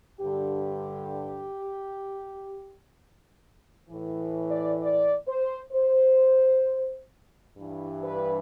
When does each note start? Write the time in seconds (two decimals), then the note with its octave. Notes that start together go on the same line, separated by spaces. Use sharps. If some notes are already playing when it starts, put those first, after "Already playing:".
0.21 G2 D3 G4
3.89 A2 E3
4.51 D5
4.82 D5
5.28 C5
5.73 C5
7.58 G2 E3
8.04 B4